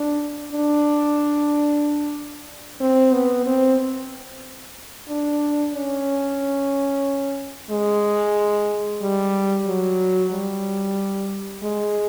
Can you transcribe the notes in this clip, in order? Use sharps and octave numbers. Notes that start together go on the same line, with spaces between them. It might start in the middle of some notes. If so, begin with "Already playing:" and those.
Already playing: D4
D4
C4
B3
C4
D4
C#4
G#3
G3
F#3
G3
G#3